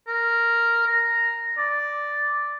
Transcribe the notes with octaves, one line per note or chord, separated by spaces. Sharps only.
A#4
A#5
D5